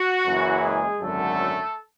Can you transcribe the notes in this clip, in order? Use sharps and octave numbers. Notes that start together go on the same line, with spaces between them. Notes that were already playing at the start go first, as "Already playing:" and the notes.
Already playing: F#4
F#1 F#2 E3
G#3 G#4
G#1 F#2 D3 F#3 A3 A4